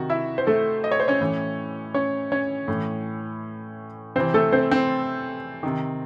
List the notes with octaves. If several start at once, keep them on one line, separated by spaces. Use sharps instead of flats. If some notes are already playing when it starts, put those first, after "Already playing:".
Already playing: C3 D#3 F#4
E4 E5
C5
A3 A4
D#5
C#5
C5
C#4 C#5
A2 E3
C#4 C#5
C#4 C#5
A2 E3
C3 E3 C4 C5
A3 A4
C4 C5
C4 C5
C3 D#3